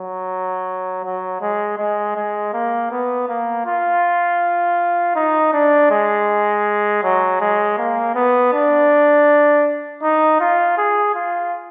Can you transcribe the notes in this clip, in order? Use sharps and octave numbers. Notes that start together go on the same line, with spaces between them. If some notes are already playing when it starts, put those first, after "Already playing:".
Already playing: F#3
F#3
G#3
G#3
G#3
A#3
B3
A#3
F4
D#4
D4
G#3
F#3
G#3
A#3
B3
D4
D#4
F4
G#4
F4